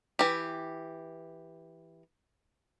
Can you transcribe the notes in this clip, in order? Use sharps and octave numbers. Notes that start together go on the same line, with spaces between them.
E3 G4